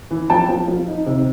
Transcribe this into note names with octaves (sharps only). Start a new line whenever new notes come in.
E3
F3 G5 A5
F3
F3
D#4
C3